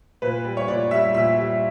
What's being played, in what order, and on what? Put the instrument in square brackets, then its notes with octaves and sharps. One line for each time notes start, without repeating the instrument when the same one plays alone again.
[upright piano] A#2 B4
G3
C#5
A#2 D5
G3 E5
A#2 E5
G3